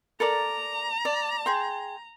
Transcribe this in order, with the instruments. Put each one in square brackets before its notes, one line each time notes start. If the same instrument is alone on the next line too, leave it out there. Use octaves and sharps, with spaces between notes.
[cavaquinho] A4 A#4 D5 [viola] A#5
[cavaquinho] D5
G#4 G5 C6